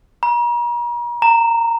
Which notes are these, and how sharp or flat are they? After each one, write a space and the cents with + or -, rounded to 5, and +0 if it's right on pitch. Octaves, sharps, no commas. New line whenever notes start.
A#5 +40
A#5 -15